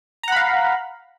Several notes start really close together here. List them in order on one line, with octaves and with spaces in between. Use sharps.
A#5 F#5 B5 F5